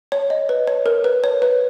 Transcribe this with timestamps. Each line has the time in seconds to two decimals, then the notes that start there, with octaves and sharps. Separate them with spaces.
0.12 C#5
0.30 D#5
0.49 B4
0.67 C#5
0.86 A#4
1.04 B4
1.24 C#5
1.42 B4